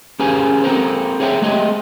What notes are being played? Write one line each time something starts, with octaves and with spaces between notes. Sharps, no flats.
C#4 G4 G#4 A#4 C5 G#5
C4 A4 A#4 C5
G#4 C5 C#5 E5 F#5 G5
G#3 A3 G4 G#4 D#5 E5